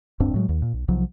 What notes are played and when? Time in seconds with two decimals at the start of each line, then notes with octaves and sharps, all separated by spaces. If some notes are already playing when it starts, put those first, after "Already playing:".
0.20 D1 G2 C4 D4
0.34 A2 F#3 G#3
0.49 D#2
0.62 A#2
0.74 B1
0.88 B1 C3 F3 F#3